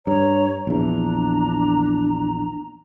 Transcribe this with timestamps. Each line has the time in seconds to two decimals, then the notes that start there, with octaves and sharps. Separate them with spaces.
0.07 G2 C#5 A#5
0.67 A#1 E2 D4 A#5